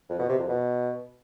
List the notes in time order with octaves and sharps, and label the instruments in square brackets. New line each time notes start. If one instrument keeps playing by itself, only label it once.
[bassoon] F2
B2
C3
F2
B2